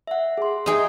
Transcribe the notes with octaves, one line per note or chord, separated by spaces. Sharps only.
E5 F#5
G#4 C6
D#4 G#4 E5 G5